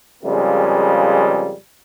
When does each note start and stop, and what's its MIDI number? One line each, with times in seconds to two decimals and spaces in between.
0.23 1.53 41
0.23 1.53 49
0.23 1.53 55
0.23 1.53 56
0.23 1.53 58